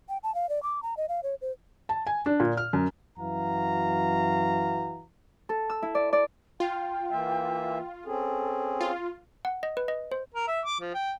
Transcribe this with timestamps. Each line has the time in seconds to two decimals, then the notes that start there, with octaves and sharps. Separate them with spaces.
0.09 G5
0.23 A5
0.35 F5
0.49 D5
0.63 D6
0.83 A#5
0.97 D#5
1.09 F5
1.23 C#5
1.41 C5
1.89 A5
2.07 G#5
2.26 D4
2.40 A#2
2.57 F6
2.73 F#2
3.19 F#2 E3 F#4 F5 A#5
5.49 A4
5.70 E6
5.82 E4
5.95 D5
6.13 D5
6.60 F4 G5
7.11 E3 A#3 E5
8.05 C4 C#4 G#4 A4
8.81 F4
9.45 F#5
9.63 D#5
9.77 B4
9.88 D#5
10.12 C5
10.34 A#4
10.48 E5
10.66 D6
10.80 F3
10.94 G5